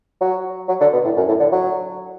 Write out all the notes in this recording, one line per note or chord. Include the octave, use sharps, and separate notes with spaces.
F#3
F#3
D3
B2
A2
F#2
A2
D3
F#3